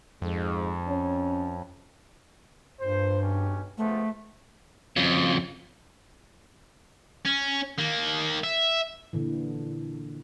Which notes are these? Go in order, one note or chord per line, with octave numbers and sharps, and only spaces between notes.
F2 G#2
C#4
G2 A#2 C5
B1 C#4 G4
C#2 F3 A3 B3
F2 C#3
C#4
D#3 A#3
E5
A#2 D3 E3